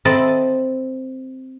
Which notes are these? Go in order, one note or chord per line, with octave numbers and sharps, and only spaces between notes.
C4 A4 D#5 E5 A5 B5